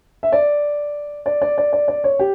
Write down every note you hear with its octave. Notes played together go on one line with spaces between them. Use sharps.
E5
D5
D5
D5
D5
D5
D5
C#5
G4